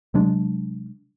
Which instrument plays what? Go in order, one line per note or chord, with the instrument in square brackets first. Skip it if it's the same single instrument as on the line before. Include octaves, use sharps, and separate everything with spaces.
[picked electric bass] C3 F#3 G#3 D4